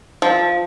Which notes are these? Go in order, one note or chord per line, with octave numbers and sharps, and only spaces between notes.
F3